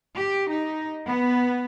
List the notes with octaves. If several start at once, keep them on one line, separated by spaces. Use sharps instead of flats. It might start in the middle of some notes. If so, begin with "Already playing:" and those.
G4
D#4
B3